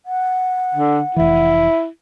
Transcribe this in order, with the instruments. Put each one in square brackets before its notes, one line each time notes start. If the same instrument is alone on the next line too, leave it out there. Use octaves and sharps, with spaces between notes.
[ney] F#5
[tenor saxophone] D3
[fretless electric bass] F1 E3 [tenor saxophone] E4